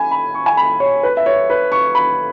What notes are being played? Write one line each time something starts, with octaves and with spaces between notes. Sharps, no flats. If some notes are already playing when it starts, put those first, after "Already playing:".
Already playing: G#5 B5
B5
C#6
G#5
B5
C#5
B4
E5
C#5
B4
C#6
B5